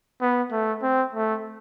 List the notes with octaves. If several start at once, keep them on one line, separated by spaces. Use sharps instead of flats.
B3
A3
C4
A3